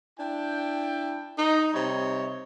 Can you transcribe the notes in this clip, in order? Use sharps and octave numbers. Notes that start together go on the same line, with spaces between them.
D4 E4 G5
D#4
C3 G3 D#4 C#5